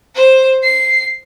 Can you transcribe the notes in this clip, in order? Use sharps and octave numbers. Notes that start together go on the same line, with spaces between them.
C5
C7